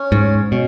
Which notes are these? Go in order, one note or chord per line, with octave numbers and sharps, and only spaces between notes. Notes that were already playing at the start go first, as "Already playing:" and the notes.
Already playing: C#4
G#2
B2 C#4